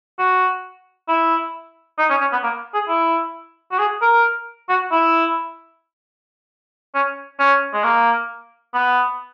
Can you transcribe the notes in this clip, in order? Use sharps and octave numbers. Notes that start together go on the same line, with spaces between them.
F#4
E4
D#4
C#4
C#4
B3
A#3
G#4
E4
F#4
G#4
A#4
F#4
E4
C#4
C#4
G#3
A#3
B3